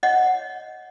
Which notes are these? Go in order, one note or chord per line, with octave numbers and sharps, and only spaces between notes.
C#5 D#5 F#5